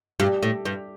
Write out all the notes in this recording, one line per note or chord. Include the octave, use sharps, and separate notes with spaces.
G2 G4
A2
G2